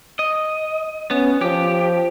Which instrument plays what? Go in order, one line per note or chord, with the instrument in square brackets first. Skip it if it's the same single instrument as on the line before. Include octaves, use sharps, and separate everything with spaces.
[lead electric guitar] D#5
[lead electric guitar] B3 [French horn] C#4
[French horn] F3 [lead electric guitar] G4